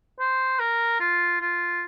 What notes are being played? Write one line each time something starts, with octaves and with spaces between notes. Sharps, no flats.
C5
A#4
F4
F4